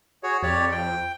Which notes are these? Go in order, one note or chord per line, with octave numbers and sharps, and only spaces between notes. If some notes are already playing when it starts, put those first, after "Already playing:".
F#4 G#4 C#5
F2 G4 C#5 D5
G5